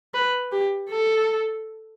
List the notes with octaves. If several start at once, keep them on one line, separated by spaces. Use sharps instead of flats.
B4
G4
A4